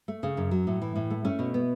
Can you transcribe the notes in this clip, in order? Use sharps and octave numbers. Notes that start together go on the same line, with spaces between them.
A3
C#3
F#2
F#3
A2
E3
A2
A3
A3 C#4
B2
B3